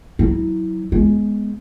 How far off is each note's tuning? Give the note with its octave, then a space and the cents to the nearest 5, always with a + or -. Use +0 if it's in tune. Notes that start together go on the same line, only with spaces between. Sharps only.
F#3 +0 E4 -20
G#3 +5 B3 +0